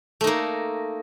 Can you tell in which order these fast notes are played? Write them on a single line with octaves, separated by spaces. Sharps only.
A3 D#4 A#3